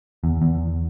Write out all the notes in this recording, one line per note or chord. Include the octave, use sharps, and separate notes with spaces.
E2
E2